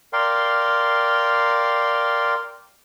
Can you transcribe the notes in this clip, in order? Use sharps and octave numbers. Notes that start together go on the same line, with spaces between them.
A#4 D5 F5 G5 C6